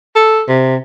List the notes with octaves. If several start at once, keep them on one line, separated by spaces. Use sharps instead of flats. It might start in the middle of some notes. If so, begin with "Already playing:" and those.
A4
C3